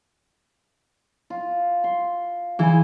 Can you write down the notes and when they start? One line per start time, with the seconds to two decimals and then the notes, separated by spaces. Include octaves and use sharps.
1.30 F4
1.84 C6
2.59 E3 G#4 G#5 B5